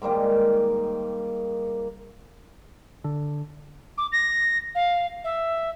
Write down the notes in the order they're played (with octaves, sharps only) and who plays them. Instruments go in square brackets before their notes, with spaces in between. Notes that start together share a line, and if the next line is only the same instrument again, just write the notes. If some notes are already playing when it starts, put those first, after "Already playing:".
[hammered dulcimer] G#2 D#3 G3 A#3
[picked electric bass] D3
[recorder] D6
A#6
F5
E5